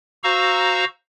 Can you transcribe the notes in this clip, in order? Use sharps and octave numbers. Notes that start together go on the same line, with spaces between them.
F#4 C5 F5 A#5 C#6 E6